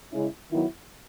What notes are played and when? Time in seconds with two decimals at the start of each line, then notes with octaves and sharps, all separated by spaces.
0.12 C#3 G#3 C#4 E4
0.51 D#3 F#3 B3 E4